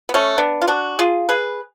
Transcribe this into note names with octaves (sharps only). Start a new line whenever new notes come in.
B3
A3 C#4
B3 D4
F4
D4 F#4
F4 G#4
G#4 B4